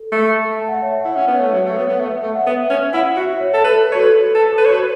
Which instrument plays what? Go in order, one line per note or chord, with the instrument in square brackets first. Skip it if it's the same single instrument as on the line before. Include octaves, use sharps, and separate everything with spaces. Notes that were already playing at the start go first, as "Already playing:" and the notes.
Already playing: [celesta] A4
[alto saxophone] A3
[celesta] A5
F#5
E5
C#5
F#5
[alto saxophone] E4
[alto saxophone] C#4 [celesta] F#5
[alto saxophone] B3
[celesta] C#5
[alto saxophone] A3
[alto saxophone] F#3 [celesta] C#5
[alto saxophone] A3
[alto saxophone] B3 [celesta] C#5
[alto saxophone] B3
[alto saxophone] A3 [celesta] E5
[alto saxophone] A3 [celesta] E5
[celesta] F#5
[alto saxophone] B3 [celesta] E5
[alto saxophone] C#4
[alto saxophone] E4 [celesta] F#5
[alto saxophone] F#4 [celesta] E5
[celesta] C#5
[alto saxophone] A4
[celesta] A4 [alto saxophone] B4
[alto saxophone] C#5
[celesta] F#4
[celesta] A4 [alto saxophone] B4
[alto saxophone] A4
[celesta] A4
[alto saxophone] B4
C#5
[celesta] F#4 [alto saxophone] B4